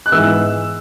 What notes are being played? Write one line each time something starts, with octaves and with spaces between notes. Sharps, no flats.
F#6
G#2 E3 B3 E6